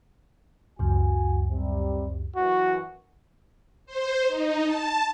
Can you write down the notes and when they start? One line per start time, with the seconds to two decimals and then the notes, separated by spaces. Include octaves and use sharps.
0.79 C#2 F#2 F#4 G#5
1.50 C3 G3
2.36 F#2 E3 F#4
3.86 C5
4.27 D#4
4.64 A5